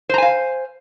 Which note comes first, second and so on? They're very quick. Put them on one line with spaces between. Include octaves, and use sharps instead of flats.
C5 A#5 G#5 F5